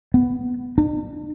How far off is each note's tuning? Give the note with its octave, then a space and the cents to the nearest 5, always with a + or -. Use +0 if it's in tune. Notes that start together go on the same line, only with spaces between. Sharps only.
B3 +0
D4 +45